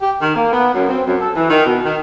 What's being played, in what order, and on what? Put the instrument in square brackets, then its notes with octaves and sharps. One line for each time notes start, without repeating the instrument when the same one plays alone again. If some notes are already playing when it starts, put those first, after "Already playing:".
[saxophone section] G4
D#3
A#3
B3
F#2
C4
F#2
A4
E3
D#3
B2
D#3